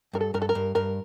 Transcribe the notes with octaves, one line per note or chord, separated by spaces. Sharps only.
G2 A#4
A4
G2 A#4
A4
A#4
G2
G2 A#4